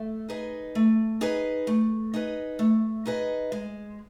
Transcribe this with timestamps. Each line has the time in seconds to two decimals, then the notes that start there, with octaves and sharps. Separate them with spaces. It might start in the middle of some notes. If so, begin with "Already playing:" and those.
Already playing: A3
0.28 D#4 G#4 B4 D#5
0.75 A3
1.21 D#4 G#4 B4 D#5
1.67 A3
2.14 D#4 G#4 B4 D#5
2.59 A3
3.06 D#4 G#4 B4 D#5
3.52 G#3